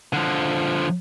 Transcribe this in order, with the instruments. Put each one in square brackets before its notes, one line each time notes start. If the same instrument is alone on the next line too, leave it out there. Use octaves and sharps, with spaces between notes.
[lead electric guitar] D3 F3